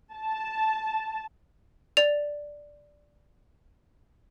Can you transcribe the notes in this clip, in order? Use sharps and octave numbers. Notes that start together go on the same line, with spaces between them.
A5
D5 F7